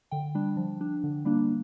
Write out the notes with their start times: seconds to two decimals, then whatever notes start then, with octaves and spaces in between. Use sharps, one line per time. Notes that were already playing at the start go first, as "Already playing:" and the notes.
0.11 D3 G5
0.35 G3 D4
0.57 F3
0.81 D4
1.04 D3
1.25 G3 A#3 D4